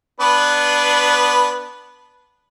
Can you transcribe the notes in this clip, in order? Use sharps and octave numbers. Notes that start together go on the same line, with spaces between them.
B3 D4 B4